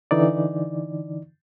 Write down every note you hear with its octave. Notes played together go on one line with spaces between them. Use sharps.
D3 E3 D#4 D5